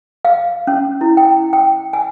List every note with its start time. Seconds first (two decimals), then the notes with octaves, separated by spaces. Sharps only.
0.25 F5
0.67 C#4
1.01 E4
1.17 G5
1.53 G5
1.93 G#5